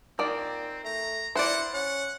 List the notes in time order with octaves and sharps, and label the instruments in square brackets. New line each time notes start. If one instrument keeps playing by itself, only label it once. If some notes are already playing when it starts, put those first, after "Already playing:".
[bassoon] A#2 [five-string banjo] D#3 D5 [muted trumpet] C4
[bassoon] A3 [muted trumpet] A#5
[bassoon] E4 [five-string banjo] C5 D5 [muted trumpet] F#5
[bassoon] C#4 [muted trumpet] F#5